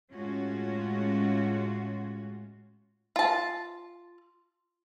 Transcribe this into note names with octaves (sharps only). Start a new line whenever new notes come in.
A2 G#3 C#4 F4 F#4
F4 A5